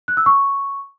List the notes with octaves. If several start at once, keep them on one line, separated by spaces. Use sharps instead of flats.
F#6
E6
C#6